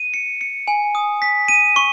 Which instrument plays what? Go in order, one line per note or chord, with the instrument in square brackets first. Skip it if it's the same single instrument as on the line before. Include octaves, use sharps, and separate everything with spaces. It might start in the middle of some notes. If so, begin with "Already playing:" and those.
Already playing: [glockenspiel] D#7
C#7
C#7
G#5
D#6
B6
D#7
C#6